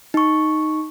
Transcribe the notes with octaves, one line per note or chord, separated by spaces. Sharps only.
D#4 C#6